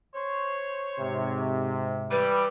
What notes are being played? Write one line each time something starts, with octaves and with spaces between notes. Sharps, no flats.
C5 C#5
G#2 C3
E3 G3 B4